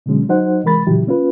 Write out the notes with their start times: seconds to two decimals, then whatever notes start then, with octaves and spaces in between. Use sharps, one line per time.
0.06 B2 D3 F#3 G#3 C#4
0.29 F#3 D#4 C5 F#5
0.64 C3 E3 G#3 A#4 B5 A6
0.87 A#2 C#3 E3 F#3 E4 G4
1.07 A#3 C#4 F4 B4